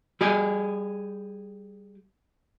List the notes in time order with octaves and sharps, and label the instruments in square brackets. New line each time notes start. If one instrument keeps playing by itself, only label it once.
[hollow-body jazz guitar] G3 G4 G#4